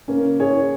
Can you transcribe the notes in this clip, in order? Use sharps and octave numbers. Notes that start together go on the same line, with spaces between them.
C#3 A#3 C#4 A#4
G#4 C#5